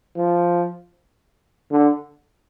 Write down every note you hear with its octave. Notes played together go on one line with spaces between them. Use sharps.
F3
D3